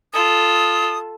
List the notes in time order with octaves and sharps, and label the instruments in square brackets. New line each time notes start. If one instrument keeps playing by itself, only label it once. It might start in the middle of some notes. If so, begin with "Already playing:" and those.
[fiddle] F4 A4 [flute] D#6